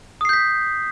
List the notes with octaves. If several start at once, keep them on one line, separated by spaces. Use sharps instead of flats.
D#6 G6 B6 C7